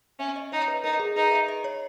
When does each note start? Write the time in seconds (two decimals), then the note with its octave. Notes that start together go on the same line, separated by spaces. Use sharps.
0.19 C#4 E5
0.36 D#5
0.52 D#4 C#5
0.68 B4
0.84 D#4 A#4
1.00 G#4
1.16 D#4 B4
1.32 E5
1.48 D#5
1.64 C#5